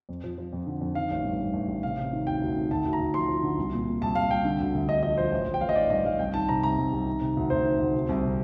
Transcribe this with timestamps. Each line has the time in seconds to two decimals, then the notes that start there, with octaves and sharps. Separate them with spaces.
0.09 F2
0.24 F3
0.38 F3
0.53 F2
0.67 D3
0.81 F2
0.95 D#3 F5
1.11 A1
1.25 G2
1.40 G2
1.54 A1
1.68 A1
1.83 C3 F5
1.98 C3
2.13 D#3
2.26 D2 G5
2.42 D2
2.56 D#3
2.71 D2 A5
2.85 D2
2.93 A#5
2.99 D2
3.14 F3 C6
3.29 F3
3.43 D3
3.58 C2
3.72 A#2
3.87 A#2
4.01 C2 A5
4.15 C2 F5
4.31 C2 G5
4.44 D3
4.60 D2
4.74 D2
4.88 D3 D#5
5.03 F3 D#5
5.17 F3 C5
5.32 A1
5.47 A1
5.54 G5
5.61 A1 F5
5.69 D#5
5.76 D#3 D5
5.90 G2 D#5
6.05 G2 F5
6.19 C2 G5
6.34 D#3 A5
6.49 C3 A#5
6.63 C2 A#5
6.78 C2
6.93 C2
7.06 D#3
7.21 C3
7.37 D2
7.50 D2 C5
7.65 D#3
7.79 D2
7.94 C3
8.09 C2
8.23 C3